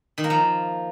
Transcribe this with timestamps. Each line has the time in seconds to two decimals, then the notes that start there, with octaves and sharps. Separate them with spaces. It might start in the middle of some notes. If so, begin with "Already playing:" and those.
0.18 D#3
0.24 A#3
0.30 F3